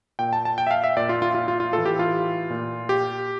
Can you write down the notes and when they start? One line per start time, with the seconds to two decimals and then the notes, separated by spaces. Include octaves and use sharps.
0.19 A#2 G5
0.33 A5
0.45 A5
0.58 G5
0.67 E5
0.71 F5
0.84 E5
0.97 A#2 D5
1.09 F4
1.22 F4
1.35 F4
1.48 F4
1.60 F4
1.73 A2 E3 A4
1.86 G4
1.99 F4
2.50 A#2
2.89 G4